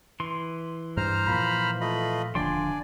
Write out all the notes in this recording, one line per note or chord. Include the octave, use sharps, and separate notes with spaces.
E3 C6
G2 C5 A#5 F6
A#2 F3 A#3 B5
A3 F4 D#5 B5
D#1 D3 F3 D4 D5 G5 G#5 C6